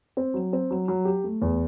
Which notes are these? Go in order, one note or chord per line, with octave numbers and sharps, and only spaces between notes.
C4
F#3
C4
F#3
F#3
G4
A3
E2